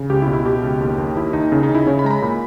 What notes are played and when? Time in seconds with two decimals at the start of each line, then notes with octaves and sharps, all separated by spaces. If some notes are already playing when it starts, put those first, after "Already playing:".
Already playing: C#3
0.10 C#2 G4
0.22 E4
0.27 B2
0.33 E4
0.45 B2 G4
0.63 C#2
0.80 D#2
0.98 D#2
1.15 D#2 E4
1.33 D#2 D#4
1.52 C#3 D#4
1.63 D#4
1.69 C#3
1.75 E4
1.86 C#3 C#5
1.99 B5
2.04 G#3 A#5
2.11 B5
2.22 A#2